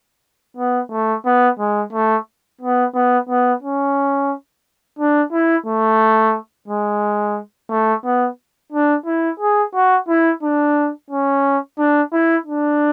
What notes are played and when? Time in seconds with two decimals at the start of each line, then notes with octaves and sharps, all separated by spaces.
0.57 B3
0.92 A3
1.25 B3
1.59 G#3
1.93 A3
2.61 B3
2.95 B3
3.29 B3
3.63 C#4
4.99 D4
5.33 E4
5.66 A3
6.68 G#3
7.70 A3
8.05 B3
8.72 D4
9.06 E4
9.40 G#4
9.75 F#4
10.08 E4
10.43 D4
11.10 C#4
11.78 D4
12.13 E4
12.46 D4